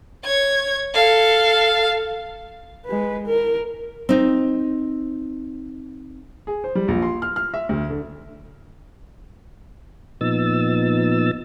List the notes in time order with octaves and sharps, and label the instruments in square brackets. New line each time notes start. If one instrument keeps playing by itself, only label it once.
[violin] C#5 G#6
A4 F5
[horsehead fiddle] G#3 B4
A#4
[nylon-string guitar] C4 D#4
[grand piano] G#4
C5
G3
A#1
C6
F6
F6
E5
D2
D3
[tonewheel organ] A#2 F3 B3 D#4 E6 A6